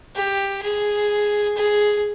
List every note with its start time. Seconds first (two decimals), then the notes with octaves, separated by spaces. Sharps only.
0.15 G4
0.63 G#4
1.57 G#4